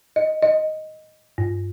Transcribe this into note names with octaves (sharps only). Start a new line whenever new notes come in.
D#5
D#5
G2